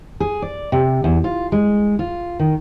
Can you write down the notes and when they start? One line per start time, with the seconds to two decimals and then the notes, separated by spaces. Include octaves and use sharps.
0.20 G#4
0.42 D5
0.72 C3
1.04 E2
1.24 F4
1.52 G#3
1.99 F4
2.39 D#3